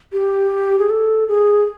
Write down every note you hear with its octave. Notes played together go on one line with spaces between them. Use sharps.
G4
G#4
A4
G#4